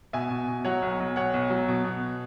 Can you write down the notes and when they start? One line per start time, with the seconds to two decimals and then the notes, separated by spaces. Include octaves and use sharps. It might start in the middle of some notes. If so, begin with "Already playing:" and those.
0.13 B2 E5 G#5
0.31 B2
0.48 B2
0.65 F#3 C#5 F#5
0.82 B1
1.00 B1
1.16 B2 C#5 F#5
1.34 B1
1.50 F#3
1.68 B2
1.84 B2